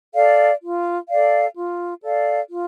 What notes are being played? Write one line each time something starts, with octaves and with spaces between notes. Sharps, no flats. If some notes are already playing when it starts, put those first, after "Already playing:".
A4 D5 F5
F4
A4 D5 F5
F4
A4 D5 F5
F4